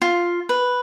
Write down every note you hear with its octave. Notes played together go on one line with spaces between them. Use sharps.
F4
B4